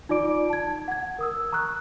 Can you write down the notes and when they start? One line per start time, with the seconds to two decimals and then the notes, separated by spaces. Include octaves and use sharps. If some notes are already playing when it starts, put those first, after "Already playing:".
0.09 D#4 F4 D5 D6 D7
0.49 A5 G#6
0.88 F#5 G#6
1.19 A#4 D#6 E6
1.52 A#5 C#6 F6 F#6